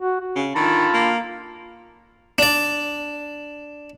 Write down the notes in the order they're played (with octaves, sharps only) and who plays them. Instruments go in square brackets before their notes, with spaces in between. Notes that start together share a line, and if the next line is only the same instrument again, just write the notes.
[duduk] F#4
F#4
[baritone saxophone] C#3
[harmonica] D3 A5 B5 [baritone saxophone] D#3 [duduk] F4
[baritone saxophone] A#3
[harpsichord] D4 D5